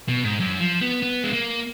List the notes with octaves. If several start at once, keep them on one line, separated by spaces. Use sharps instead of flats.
B2
G#2
F#2
F3
B3
B3
G#3
A#3